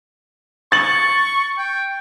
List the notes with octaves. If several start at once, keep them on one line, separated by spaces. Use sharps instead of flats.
C#6 A6 F#7
G5